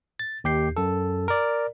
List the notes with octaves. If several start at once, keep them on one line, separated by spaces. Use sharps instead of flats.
A6
D#2 G4 G6 C7
F#2 A4
A#4 D5